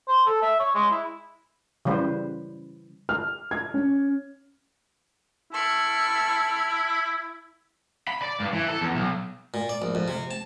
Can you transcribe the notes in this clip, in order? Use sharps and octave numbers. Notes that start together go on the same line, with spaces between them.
C5
A4
E5
C#5
G#3
E4
C#3 E3 G3 B4 C5
F6
G#6
C#4
E4 A5 C#6 F6
B5
D5
G2
E3
A4
E2
B1
A#2
D5
A#1
F2
C3
A5